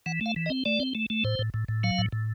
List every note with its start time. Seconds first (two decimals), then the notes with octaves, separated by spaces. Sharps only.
0.06 E3 F#5
0.21 A3 F5
0.36 E3
0.46 D#5
0.50 C4
0.65 A3 D5
0.80 C4
0.95 A3
1.10 A3
1.24 A2 C5
1.39 A2
1.54 A2
1.68 A2
1.83 F#3 F5
1.98 A2
2.12 A2